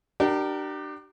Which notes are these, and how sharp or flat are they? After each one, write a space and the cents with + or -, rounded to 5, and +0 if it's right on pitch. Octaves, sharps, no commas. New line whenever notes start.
D4 +25 G4 -35 A#4 +0